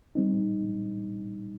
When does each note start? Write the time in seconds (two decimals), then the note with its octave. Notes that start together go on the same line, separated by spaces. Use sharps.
0.15 G3 C4 D#4